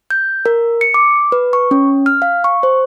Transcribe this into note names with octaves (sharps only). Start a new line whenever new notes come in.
G6
A#4
C#7
D6
B4
C#6
C#4
F6
F5
C#6
C5